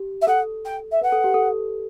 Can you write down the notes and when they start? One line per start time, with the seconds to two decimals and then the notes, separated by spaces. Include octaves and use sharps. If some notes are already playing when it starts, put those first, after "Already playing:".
Already playing: G4
0.21 E5
0.27 A4 F#5
0.65 G5
0.91 E5
1.01 B4 F#5
1.12 A4
1.24 G4
1.34 A4